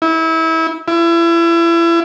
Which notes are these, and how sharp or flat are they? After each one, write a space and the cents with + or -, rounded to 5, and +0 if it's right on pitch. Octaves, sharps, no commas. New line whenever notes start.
E4 -25
E4 +35